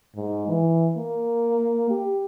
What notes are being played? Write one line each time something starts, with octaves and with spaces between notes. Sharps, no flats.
G#2
E3
A#3
G4